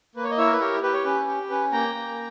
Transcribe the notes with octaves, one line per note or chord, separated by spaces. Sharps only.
A#3 B4
C#5
D#5
E4 C#5 E5
A#4
B4
G4 A#4 C#5
G4 B4
C#5
C#4 B4
G4
C#4 B4
A#3 G5 A#5
A#3